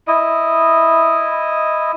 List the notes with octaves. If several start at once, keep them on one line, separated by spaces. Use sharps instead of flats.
E4 D#5